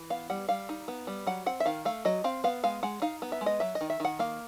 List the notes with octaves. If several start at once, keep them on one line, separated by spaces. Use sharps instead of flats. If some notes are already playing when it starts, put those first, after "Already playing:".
Already playing: E3
B3 F5
G3 F#5
G3 F5
D#4
B3
G3
F#3 F#5
C4 F#5
E5
D#3 F5
A3 F5
F#3 D#5
C4 F5
B3 F5
G#3 F5
G#3 F#5
D#4 F5
B3
E5
G#3
D#5
F#3 E5
D#5
D#3
E5
D#3 F#5
A#3 F5